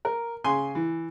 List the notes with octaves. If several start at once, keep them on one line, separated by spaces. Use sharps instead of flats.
A#4
C#3 G#5 C6
E3